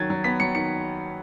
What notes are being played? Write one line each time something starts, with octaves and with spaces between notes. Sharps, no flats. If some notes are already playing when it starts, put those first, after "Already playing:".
Already playing: D#3 F#3 G#6 A6
F#3
B3 B6
F#3 C#7
D#3 C#7